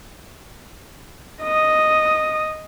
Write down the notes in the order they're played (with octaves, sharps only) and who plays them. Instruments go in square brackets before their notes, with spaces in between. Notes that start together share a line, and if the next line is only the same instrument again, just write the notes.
[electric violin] D#5 D#6